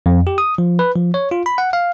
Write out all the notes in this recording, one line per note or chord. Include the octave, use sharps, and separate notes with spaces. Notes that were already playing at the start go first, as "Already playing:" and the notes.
F2
G4
D#6
F3
B4
F3
C#5
F4
B5
F#5
F5